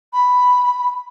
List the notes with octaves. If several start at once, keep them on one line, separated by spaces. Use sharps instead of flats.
B5